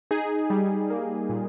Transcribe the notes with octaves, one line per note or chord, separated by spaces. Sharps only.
D#4 G#4
G3
A#3
A#2